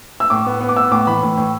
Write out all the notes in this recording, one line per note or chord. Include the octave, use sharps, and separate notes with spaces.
E6
A2 D6
B3
B3
D6
B3 E6
A2 D6
E3 B5
A2
A2